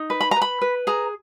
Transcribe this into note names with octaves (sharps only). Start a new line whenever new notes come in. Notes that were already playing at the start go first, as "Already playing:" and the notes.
Already playing: D#4
B4
B5
B4 A#5
B5
B4
G#4 A#5